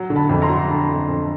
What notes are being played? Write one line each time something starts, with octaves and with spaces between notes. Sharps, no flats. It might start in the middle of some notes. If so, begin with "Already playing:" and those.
Already playing: F#3
D3
A5 B5
F2
A#5 C6
F#3
D3 A5 B5
F2
F2